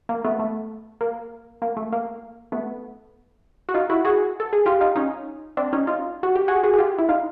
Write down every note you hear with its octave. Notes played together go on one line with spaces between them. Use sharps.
A#3
A3 B3
A3
A#3
A#3
A3
A#3
A3 B3
F#4
D#4 F4
E4 F#4
F#4 G#4
A4
G#4
F4 G4
D#4 F4
C#4 D#4
C4 D4
C#4 D#4
D#4 F4
F#4
G4
F#4 G#4
F#4 G#4
G#4
F4 G4
E4
D#4 F4